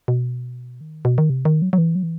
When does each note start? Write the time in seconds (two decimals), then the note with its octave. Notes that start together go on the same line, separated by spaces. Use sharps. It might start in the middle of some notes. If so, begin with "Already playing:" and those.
0.08 B2
0.81 D#3
1.05 B2
1.18 D#3
1.30 C3
1.45 D#3
1.62 F#3
1.73 F#3
1.78 E3
1.95 F#3
2.03 E3